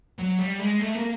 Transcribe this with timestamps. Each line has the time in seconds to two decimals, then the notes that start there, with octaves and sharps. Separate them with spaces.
0.19 F#3
0.39 G3
0.59 G#3
0.80 A3
0.95 A#3